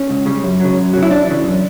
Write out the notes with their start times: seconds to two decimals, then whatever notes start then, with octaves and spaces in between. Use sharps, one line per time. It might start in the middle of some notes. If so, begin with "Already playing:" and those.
Already playing: C#4
0.10 C#2
0.26 C#3 G3
0.43 F#2
0.60 C#3 F#3
0.77 F#2
0.93 C#3 F#3
1.03 E4
1.10 F#2 D4
1.27 C#3 E3
1.44 F#2